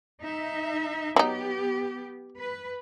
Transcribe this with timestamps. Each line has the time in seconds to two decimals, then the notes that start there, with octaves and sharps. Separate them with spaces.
0.21 D#4 E5
1.16 F#3 B3 D#4 G4
2.39 B4